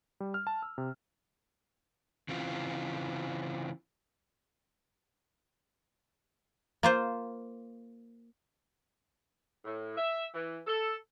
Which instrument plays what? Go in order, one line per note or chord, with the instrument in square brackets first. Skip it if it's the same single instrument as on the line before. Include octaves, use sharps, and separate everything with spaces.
[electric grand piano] G3
F6
A5
E6
C3
[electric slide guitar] C#3 E3 C4 F4
[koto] A#3 F4 C5
[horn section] A2
E5
E3
A4